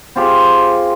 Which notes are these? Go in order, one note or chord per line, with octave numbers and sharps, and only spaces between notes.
C4 F4 G4 G#4